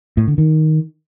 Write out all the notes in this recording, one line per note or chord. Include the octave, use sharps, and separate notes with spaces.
A2
D3
D#3